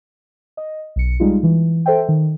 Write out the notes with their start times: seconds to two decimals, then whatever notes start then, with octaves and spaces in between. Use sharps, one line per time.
0.57 D#5
0.96 B1 C#7
1.20 G3 G#3 D#4 F4
1.43 E3
1.86 A4 C5 E5 G5
2.09 D#3